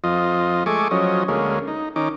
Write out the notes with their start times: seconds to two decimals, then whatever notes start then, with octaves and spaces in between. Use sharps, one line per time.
0.04 F2 F4 D#5
0.66 G#3 A3 G#5 C#6 D6
0.91 F3 F#3 C#4 D#5
1.28 D2 G#3 A#3 C#4
1.67 D#4
1.96 D#3 C#4 D#4 D6